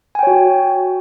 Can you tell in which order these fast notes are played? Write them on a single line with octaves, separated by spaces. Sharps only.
G#5 G5 C#5 F#4